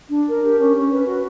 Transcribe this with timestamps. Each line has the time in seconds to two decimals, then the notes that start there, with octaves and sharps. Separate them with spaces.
0.10 D4
0.26 A#4
0.41 G4
0.58 C#4
0.74 C#4
0.90 B4
1.05 F#4